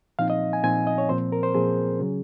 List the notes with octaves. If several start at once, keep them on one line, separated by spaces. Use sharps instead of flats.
A#2 F3 C4 D#4 F5
D#5
G#5
A#2 F3 C4 D#4 G#5
D#5
C#5
A#2 F3 C4 C5
A#4
C5
A#2 F3 C4 G#4
C#3 F#3 C#4